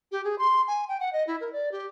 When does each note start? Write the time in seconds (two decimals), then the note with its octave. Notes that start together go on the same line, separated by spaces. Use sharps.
0.12 G4
0.24 G#4
0.38 C6
0.67 G#5
0.88 G5
1.00 F#5
1.13 D#5
1.27 E4
1.41 A#4
1.53 D5
1.72 G4